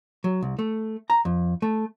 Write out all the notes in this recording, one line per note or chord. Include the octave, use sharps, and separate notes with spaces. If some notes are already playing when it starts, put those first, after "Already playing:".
F#3
C2
A3
A#5
F2
A3